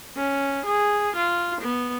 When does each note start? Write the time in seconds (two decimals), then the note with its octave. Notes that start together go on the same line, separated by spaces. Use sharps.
0.17 C#4
0.66 G#4
1.16 F4
1.61 B3